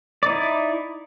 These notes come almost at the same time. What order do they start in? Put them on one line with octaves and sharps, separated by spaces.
D5 D#4 E4